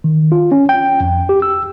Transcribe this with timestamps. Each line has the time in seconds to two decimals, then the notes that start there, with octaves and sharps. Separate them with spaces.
0.04 D#3
0.32 F4
0.52 C#4
0.69 G5
1.00 F2
1.29 G4
1.42 E6